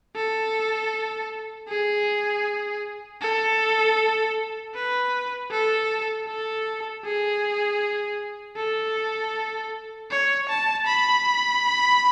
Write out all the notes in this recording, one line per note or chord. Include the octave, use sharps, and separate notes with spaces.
A4
G#4
A4
B4
A4
A4
G#4
A4
C#5
A5
B5